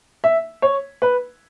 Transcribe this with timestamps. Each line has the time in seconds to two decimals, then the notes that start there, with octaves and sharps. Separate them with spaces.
0.24 E5
0.62 C#5
1.02 B4